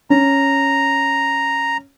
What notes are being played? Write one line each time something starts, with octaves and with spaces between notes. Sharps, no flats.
C#4 A#5